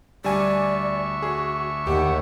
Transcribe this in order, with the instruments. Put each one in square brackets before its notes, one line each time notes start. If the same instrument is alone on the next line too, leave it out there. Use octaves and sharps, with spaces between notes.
[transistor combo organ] D2 E5 C#6 [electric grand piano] G3 G#5 [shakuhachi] D5
[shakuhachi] F#4 [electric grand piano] G#4
[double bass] D#2 [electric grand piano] G4 [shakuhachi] F#5